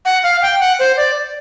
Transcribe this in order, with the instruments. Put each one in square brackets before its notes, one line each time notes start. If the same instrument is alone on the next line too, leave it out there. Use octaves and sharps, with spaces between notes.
[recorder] F#5
F5
G5
F#5
C5
D5